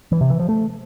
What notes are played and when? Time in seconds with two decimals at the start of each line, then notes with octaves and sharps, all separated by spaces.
0.12 E3
0.21 C3
0.30 E3
0.39 F3
0.49 A3